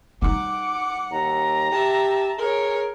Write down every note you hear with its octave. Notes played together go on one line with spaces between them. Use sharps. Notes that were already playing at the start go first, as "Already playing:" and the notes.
G3 D#4 F#5 D6
D#2 A#5
G4 E5 A5
G#4 A#4 C#5